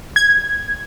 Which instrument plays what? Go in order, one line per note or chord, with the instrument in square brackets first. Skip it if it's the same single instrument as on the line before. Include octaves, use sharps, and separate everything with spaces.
[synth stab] G#6